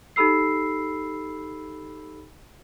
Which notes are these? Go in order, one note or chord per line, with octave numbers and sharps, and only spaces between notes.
D#4 G4 A4 B5 E6 C7